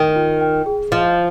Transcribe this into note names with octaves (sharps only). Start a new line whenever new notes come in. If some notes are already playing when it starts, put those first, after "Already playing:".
Already playing: D#3 G5
F4
G5
G#4
F3 D#5